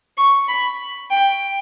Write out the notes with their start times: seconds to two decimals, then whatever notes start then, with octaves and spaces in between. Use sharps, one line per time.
0.17 C#6
0.48 B5
1.10 G5